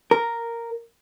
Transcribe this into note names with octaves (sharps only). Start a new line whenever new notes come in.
A#4